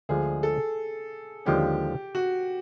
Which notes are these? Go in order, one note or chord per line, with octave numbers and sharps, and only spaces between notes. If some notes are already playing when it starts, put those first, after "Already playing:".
D2 D3 F3 G#3 G#4
A4
D#2 D3 F3 G#3 C#4 G4
F#4